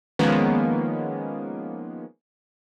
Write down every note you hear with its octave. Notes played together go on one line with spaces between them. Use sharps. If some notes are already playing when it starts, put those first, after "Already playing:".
D#3 F3 G#3 A#3 B3 C#4